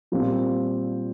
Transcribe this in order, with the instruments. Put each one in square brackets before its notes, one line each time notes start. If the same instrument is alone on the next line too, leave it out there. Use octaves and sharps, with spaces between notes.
[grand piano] A#2 G3 C4 F4